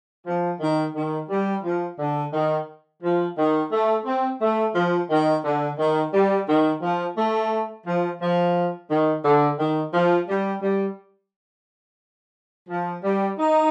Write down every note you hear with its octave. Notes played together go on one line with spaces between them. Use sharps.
F3
D#3
D#3
G3
F3
D3
D#3
F3
D#3
A3
C4
A3
F3
D#3
D3
D#3
G3
D#3
F3
A3
F3
F3
D#3
D3
D#3
F3
G3
G3
F3
G3
D#4